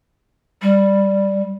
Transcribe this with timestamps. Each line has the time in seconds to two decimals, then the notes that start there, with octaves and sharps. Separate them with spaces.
0.62 G3